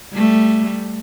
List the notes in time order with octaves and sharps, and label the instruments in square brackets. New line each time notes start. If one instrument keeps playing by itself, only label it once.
[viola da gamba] G3 A3